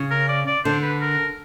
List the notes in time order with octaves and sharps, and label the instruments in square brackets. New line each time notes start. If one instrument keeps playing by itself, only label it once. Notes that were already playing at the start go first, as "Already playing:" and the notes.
Already playing: [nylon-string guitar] C#3
[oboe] A#4
D5
D5
[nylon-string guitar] D3 [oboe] C5
[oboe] B4
A#4